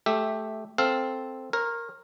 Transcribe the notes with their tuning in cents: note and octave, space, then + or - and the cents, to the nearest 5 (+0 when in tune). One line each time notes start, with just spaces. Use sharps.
A3 -15 G4 +0 E5 +0
C4 +0 A4 +0 F5 +0
A#4 +0 C#5 -40